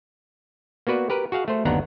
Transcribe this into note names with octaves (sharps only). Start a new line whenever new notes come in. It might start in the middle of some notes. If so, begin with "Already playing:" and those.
A#3 B3 F#4 B4 D5
G4 A#4 B4
F#4 G#4 F5 F#5
A3 C5
G1 D#2 B3 D4 F#5 A#5